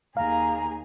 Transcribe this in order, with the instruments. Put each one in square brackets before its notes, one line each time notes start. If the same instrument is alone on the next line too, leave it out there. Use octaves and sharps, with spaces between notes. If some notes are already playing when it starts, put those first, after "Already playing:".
[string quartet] D#2 G#4 [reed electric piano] F5 [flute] A#5